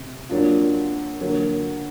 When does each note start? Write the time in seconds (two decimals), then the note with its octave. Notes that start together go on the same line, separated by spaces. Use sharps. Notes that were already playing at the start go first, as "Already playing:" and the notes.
Already playing: C3
0.30 F#3 A#3 D4 F4
1.21 D3 F#3 A#3